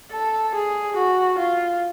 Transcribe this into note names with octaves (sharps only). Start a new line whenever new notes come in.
A4
G#4
F#4
F4